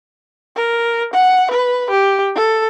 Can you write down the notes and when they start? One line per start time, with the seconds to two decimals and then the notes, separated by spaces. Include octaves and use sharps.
0.56 A#4
1.13 F#5
1.51 B4
1.90 G4
2.35 A4